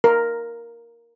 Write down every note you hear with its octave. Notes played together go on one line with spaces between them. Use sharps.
A#4